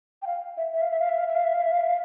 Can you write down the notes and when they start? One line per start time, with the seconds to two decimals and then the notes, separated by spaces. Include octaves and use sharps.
0.22 G5
0.26 F5
0.57 E5
0.74 E5
0.82 F5
0.91 E5
1.00 F5
1.09 E5
1.18 F5
1.27 E5
1.35 F5
1.44 E5
1.54 F5
1.62 E5
1.71 F5
1.81 E5
1.89 F5